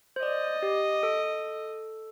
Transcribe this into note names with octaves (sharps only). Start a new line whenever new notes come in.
C5
D5 D#5
G4
A4